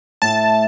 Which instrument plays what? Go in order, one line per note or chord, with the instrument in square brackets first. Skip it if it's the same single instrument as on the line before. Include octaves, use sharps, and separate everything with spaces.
[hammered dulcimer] A2 [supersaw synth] A5